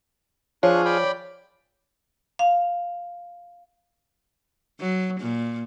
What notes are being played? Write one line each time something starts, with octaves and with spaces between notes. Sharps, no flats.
F3 D4 F4 G#4 C#5 C#6 F#6
D5 G5 B5
F5
F#3
A#2